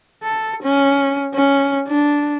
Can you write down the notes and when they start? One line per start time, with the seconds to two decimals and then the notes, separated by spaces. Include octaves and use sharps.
0.23 A4
0.63 C#4
1.35 C#4
1.88 D4